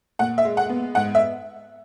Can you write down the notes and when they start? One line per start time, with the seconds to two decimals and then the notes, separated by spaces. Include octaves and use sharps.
0.19 A#2 F#5
0.38 E5
0.45 G#3
0.57 F#5
0.69 B3
0.95 G#2 F#5
1.15 E5